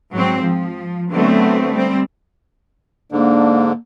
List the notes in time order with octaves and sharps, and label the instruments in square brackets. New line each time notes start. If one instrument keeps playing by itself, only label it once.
[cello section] G#2 F#3 C4
F3
D3 F#3 A3 B3 C4
G3 C4
[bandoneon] G#2 D3 [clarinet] A#3 [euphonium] D4